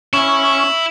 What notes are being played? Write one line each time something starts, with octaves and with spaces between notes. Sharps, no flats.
C#4 E4